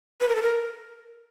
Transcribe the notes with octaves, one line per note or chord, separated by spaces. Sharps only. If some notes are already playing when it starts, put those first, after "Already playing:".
B4
A#4
A4
A#4